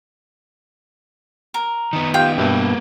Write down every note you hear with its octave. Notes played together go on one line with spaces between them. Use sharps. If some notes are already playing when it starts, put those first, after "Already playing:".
A#4
D#3 B3
F4 G4 F5 G5
G2 B2 A#3 B4 E5